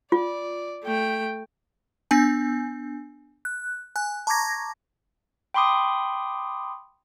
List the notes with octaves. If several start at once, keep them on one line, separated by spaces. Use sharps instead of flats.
F4 D5
A3 G5
B3 D4 G#5
F#6
G#5 F#6
A5 A#5 C#6 D6 G#6 A#6
G5 B5 C6 D6 D#6